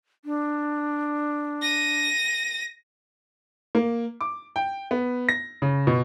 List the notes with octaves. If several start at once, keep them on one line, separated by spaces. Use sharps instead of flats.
D4
A#6 D#7
A#3
D6
G5
B3
A#6
C#3
B2